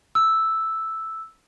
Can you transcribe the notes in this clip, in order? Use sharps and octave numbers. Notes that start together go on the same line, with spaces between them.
E6